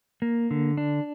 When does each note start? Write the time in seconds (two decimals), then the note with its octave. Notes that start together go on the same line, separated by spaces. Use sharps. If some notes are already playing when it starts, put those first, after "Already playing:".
0.22 A#3
0.51 D3
0.77 D4